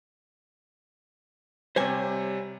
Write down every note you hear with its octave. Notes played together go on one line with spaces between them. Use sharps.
C3 G3 C5 C#5 G#5